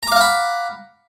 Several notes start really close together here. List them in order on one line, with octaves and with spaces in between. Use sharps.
A#5 D6 F5 F#5 B5